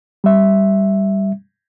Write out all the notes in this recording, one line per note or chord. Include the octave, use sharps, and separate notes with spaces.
G3 E5